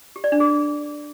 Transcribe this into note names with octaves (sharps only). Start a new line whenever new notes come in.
G4
D5
D4
G#4